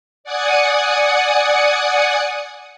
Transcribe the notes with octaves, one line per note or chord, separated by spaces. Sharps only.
D5 F#5 G#5 D#6 C#7